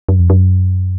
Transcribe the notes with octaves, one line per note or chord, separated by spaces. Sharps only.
F#2
F2
F#2